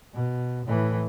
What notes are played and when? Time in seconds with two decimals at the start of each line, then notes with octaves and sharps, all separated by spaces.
0.14 B2
0.66 A2 E3